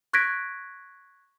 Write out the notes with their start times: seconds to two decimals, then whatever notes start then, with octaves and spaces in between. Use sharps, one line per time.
0.13 C#6 F#6 G#6 A#6 B6 D7